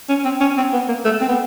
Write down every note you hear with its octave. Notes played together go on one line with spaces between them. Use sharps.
C#4
C4
C#4
C4
B3
A#3
A3
C4
B3